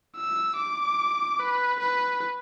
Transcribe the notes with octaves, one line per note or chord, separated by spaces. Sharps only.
E6
D6
B4
B4